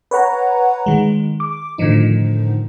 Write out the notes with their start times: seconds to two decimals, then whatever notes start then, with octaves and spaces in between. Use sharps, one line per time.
0.11 B4 C#5 F#5 A#5
0.86 D#3 G#3
1.40 D6
1.78 A2 D3 D#3 F3 D#4